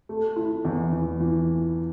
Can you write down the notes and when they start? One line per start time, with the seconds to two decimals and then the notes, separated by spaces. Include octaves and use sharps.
0.09 A3
0.36 E4
0.65 E2
0.93 E2
1.20 E3